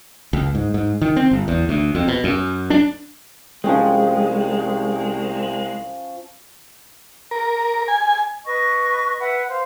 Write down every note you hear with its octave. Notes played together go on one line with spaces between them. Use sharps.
C#2
G#2
G#2
D#3
C4
G1
E2
D2
F2
B2
F#2
D4
C2 F3 G#3 C#4 G5
A#4
G#5
B4 D#5 C#6
B4 E5 F#5
C5 F5